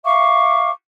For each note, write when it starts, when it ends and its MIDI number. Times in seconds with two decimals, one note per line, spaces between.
0.04 0.70 76
0.04 0.70 77
0.04 0.70 85
0.04 0.70 86